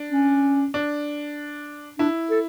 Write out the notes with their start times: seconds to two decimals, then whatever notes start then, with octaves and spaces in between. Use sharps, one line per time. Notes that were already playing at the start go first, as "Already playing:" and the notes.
Already playing: D4
0.12 C#4
0.74 D4
1.99 D4 E4
2.30 A4